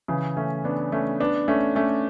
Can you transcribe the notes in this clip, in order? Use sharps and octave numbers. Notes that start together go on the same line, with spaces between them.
C#3 E3
A3 C#4
B3 D4
A3 C#4
B3 D4
A3 C#4
A3 C#4